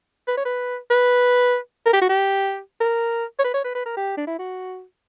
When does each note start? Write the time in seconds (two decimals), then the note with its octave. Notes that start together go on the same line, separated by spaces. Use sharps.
0.27 B4
0.37 C#5
0.45 B4
0.90 B4
1.85 A#4
1.93 G4
2.01 F#4
2.09 G4
2.80 A#4
3.39 C#5
3.44 B4
3.54 C#5
3.64 B4
3.75 B4
3.85 A#4
3.97 G4
4.17 D4
4.27 E4
4.39 F#4